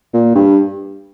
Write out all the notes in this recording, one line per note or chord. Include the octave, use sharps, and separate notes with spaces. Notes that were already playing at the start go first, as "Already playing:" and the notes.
A#2
G2